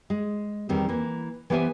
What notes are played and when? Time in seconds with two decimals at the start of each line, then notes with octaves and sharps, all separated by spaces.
0.10 G#3
0.69 E2 D#3 G3 C4
0.89 E3 A#3
1.50 E3 B3 G4 C5 E5 G#5